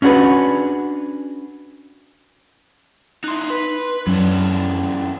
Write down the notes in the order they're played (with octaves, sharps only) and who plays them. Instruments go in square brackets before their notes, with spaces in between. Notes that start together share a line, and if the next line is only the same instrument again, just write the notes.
[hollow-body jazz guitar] C#4 D4 F#4 G#4 B4
[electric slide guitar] D#4 E4 [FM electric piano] C6 F#6
[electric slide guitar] B4
[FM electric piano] F#2 [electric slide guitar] E3 C#4 D4